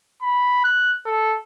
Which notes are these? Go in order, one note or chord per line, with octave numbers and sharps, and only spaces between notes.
B5
F#6
A4